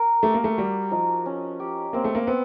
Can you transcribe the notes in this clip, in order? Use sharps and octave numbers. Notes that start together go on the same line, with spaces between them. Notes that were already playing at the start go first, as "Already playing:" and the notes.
Already playing: A#4
A3 G4
A#3
A3
G3 F#4
F3 D#4
C#4
G4
A#3 C4
A3
A#3
B3 C4